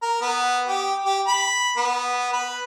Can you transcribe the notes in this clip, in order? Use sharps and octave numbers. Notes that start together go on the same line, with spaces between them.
A#4
B3
G4
G4
B5
B3
B4